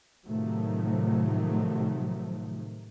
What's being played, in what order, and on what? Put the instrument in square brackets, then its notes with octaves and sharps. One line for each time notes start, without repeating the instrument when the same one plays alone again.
[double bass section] A2 C3 D#3 F3 F#3 A3